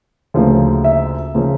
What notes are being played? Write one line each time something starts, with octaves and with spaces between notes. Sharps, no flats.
D2 C#3 F3 A#3
E5
C#3 F3 A#3